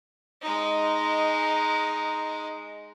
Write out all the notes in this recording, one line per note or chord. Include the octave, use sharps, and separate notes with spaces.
G#3 D#4